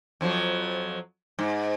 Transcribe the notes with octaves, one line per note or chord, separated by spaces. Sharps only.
F2 F3 F#3
G#2